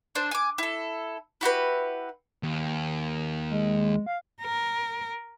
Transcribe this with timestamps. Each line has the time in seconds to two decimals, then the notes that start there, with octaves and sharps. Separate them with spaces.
0.15 D4 C5
0.31 G#5 D6
0.58 E4 A4
1.41 E4 F#4 G4 B4
2.43 D#2
3.51 G#3
4.06 F5
4.42 A#4